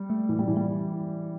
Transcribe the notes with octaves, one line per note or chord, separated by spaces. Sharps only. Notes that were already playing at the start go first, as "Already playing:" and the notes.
Already playing: G3
A3
A2 E3
G3
A2 E3
G3